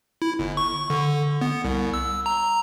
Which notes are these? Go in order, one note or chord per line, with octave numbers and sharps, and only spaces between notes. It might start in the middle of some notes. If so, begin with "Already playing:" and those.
E4
G1
C#6
D3
B3
C2
E6
A#5